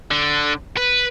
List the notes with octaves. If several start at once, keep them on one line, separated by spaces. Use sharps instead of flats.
D3
B4